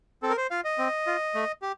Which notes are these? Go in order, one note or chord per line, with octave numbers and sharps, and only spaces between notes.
C4 A4
A#4
C5
F4 F5
D#5
C4
F4
A3
G4